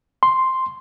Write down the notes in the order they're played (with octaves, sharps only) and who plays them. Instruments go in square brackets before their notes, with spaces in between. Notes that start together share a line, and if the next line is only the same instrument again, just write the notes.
[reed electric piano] C6